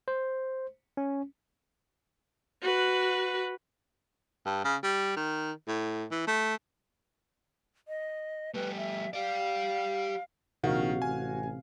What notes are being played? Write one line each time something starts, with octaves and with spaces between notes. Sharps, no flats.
C5
C#4
F#4 B4
G2
C#3
G3
D#3
A2
E3
A3
D#5
G3 A3 B4
E5
G4 D5 F5
A#1 C3 D#3 F#4 F5
A1 G#5